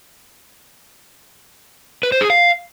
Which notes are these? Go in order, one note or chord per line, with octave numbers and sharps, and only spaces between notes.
B4
C5
G#4
F5